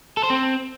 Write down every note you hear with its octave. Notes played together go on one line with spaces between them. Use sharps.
A4
C5
C4